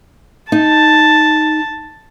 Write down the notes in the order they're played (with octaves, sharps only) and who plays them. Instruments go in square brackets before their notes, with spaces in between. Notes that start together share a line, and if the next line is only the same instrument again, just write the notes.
[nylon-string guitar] D#4 [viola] A5